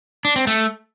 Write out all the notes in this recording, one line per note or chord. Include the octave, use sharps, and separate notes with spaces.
D4
C4
A3